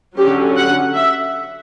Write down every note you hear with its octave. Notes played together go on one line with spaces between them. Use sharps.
D3 F#3 C#4 G4
F#5
E5